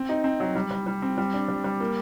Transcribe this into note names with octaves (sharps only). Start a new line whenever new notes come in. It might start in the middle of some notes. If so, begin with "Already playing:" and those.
Already playing: C4
D#4
C4
F#3
G3
G3
G3
C4
G3
D4
G3
G3
A#3